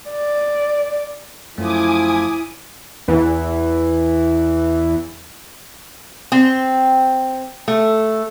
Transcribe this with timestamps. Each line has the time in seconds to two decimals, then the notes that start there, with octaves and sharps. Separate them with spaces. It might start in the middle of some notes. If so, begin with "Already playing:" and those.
0.10 D5
1.58 F#2 F3 A3 E4 G#5 D6 D#6
3.08 E2 E3
6.32 C4
7.68 A3